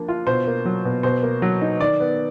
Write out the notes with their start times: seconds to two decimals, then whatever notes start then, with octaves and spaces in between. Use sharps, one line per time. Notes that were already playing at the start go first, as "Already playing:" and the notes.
Already playing: F3 A#3 D4
0.09 F4
0.27 B2 C5
0.47 A#3
0.65 F#3
0.85 B2
1.03 B2 C5
1.23 A#3
1.42 F#3
1.62 D#4
1.80 D#3 D5
2.00 B3